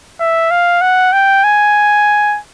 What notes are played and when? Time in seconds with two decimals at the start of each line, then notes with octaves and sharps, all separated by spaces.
0.20 E5
0.51 F5
0.81 F#5
1.13 G5
1.44 G#5